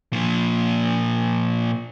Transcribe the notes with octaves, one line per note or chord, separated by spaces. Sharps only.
A#2 F3